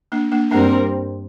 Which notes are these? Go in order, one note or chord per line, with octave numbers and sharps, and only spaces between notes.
A#3 D4
A#3 D4
G2 G3 A#3 C4 D4 A#4